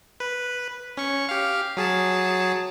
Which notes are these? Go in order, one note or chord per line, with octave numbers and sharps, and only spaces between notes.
B4
C#4 C#6
G4 F5
F#3 G#4 A5